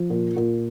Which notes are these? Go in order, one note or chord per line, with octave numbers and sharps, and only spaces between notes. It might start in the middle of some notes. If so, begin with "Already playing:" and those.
Already playing: F3
A#2
A#2